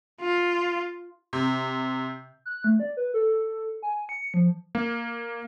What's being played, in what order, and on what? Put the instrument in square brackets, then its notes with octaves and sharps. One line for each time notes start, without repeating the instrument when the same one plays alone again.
[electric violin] F4
[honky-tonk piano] C3
[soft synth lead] F#6
A3
D5
B4
A4
G#5
C#7
F3
[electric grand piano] A#3